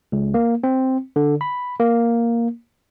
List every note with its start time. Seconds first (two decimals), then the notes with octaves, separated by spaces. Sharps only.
0.12 C#2
0.34 A#3
0.64 C4
1.16 D3
1.41 B5
1.80 A#3